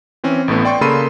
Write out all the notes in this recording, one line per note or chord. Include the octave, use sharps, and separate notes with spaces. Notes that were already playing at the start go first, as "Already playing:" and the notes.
E3 C4 C#4
A1 A2 A3 B3
D5 G5 C6 C#6
C#3 A#3 A4 B5 C6 D#7